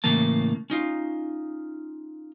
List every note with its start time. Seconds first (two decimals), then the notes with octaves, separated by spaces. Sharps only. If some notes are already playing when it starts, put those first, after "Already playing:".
0.04 A2 C#3 E3 A#3 A5
0.70 C#4 D#4 F4